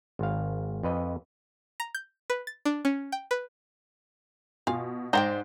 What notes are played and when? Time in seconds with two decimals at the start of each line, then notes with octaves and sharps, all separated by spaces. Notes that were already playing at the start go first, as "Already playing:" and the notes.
0.19 G#1 F5
0.83 F2 B4 D#5
1.80 A#5
1.95 G6
2.30 B4
2.47 A6
2.65 D4
2.85 C#4
3.12 G5
3.31 B4
4.67 B2 F4 F5 G#5
5.13 G#2 C5 D5 D#5 F#5 G5 A#5